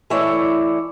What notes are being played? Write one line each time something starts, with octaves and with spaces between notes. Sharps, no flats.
E3 A3 E4 C#5 D5